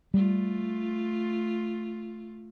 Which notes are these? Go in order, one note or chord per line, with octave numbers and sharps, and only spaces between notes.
G3 A3 F4